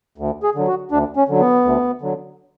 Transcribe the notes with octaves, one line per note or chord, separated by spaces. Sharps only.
D2
G#4
D3 F#3
F#4
D2 D4
C#4
D3 F#3
B3
D2
D3 F#3